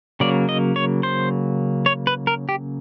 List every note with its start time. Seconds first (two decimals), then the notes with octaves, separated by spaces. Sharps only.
0.20 C#3 F#3 A#3 D5
0.49 D#5
0.76 C#5
1.03 C5
1.86 C#5
2.07 B4
2.27 A#4
2.49 G4